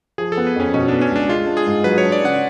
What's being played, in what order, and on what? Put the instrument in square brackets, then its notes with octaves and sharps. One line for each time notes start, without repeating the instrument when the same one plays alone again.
[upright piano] F3 [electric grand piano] G#4
[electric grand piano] A4
[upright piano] B3
[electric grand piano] B4
[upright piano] F2 [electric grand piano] C#4
[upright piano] B2 [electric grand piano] C#4
[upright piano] B3 [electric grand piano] D4
[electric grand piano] C#4
[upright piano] C#2 [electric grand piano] D4
[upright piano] G#3 [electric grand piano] F4
[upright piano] D4
[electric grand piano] G#4
[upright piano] G#2
[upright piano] F#3 [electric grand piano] B4
[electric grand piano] C#5
[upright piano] D4
[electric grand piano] D5
[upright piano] C#3 [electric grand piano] F#5